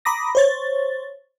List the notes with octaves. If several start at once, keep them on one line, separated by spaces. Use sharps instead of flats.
A#5 B5 D6 D#6 A#6
C5 C#5 A6